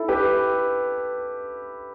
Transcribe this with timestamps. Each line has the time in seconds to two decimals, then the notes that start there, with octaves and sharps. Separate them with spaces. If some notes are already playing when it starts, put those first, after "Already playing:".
Already playing: E4 A4
0.09 G4 B4